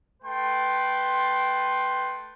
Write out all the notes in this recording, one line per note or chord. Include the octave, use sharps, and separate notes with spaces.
A3 B4 G5 C6